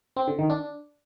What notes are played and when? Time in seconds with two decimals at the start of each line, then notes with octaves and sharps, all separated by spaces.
0.17 C4
0.28 D3
0.39 D#3
0.50 D4